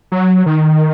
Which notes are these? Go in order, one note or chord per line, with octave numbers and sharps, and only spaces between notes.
F#3
D#3